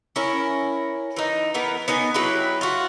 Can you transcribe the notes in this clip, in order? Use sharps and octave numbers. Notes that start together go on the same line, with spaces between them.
C#4 E4 A#4
E3 D#4
E3 B3 A#4
B3 D#4 G#5
F#3 E4 G4 B4
F4 F#4